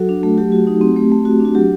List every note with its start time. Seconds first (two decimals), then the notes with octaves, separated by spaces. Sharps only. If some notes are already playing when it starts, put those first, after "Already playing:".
Already playing: F#3 F#4 A4
0.09 D4
0.23 A3
0.38 F#3 G4
0.52 F#4
0.67 D#4
0.81 C4
0.96 A3
1.12 A3
1.25 F#4
1.40 D4 F#4
1.55 F#3 G4